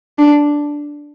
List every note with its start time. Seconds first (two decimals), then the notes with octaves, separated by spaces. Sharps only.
0.19 D4